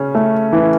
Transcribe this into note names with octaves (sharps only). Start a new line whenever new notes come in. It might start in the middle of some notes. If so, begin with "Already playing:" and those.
Already playing: C#3 C#4
A3
E3